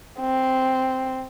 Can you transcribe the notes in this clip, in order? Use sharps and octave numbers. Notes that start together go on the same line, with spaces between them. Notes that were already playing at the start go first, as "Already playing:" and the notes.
C4